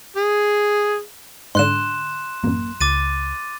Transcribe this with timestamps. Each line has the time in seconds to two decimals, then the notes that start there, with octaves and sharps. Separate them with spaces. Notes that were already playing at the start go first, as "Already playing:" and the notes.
0.17 G#4
1.55 G#2 D3 C6 F#6 E7
2.44 A1 F#2 A#3
2.81 C#2 D6 A6 D#7